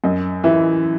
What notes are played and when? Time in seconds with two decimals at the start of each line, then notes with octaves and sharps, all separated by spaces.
0.04 F#2 D#5
0.44 E3 E5